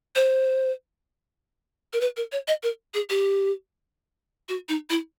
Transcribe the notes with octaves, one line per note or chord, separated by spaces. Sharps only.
C5
A#4
B4
A#4
C#5
D#5
A#4
G#4
G4
F#4
D#4
E4